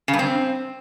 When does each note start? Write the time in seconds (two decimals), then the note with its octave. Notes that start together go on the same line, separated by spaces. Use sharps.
0.08 C#3
0.14 G2
0.19 C4